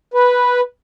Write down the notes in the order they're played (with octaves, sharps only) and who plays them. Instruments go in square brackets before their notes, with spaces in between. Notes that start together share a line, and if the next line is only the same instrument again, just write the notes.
[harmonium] B4